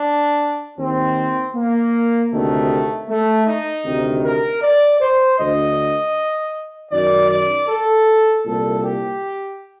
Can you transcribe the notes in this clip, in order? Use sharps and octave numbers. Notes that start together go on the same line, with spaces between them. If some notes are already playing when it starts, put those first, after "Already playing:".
Already playing: D4
D#2 D#3 C4
A#3
D2 C3 D#3 A3
A3
D#4
D2 C3 D#3
A#4
D5
C5
D2 D3 D#5
F#2 D#3 D5
D5
A4
C2 A#2 A4
G4